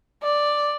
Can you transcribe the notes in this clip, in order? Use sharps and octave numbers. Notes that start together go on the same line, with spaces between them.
D5